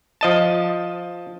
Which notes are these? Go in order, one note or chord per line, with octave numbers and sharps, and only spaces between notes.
F3 D#5 A5